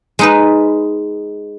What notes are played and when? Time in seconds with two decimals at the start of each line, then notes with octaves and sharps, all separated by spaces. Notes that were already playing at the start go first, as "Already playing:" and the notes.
0.19 G#3 D#4 B4